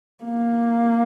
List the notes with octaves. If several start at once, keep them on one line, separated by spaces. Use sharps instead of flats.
A#3